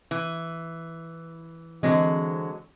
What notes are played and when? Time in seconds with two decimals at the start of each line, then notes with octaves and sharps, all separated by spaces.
0.11 E3
1.83 D3 E3 F#3 G#3 C4